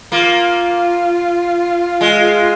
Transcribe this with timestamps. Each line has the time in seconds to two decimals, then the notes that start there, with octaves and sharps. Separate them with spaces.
0.12 A#3 F4
2.01 G#3